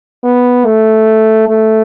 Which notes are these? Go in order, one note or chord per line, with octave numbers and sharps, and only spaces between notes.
B3
A3
A3